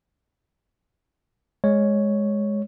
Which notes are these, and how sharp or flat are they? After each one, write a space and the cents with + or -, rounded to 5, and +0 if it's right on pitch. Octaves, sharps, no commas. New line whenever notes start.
G#3 +0 C#5 +0